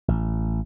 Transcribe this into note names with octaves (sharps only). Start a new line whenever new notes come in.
A1